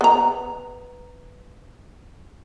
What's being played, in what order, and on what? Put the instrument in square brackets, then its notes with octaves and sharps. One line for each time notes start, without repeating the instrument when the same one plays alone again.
[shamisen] B3 A#5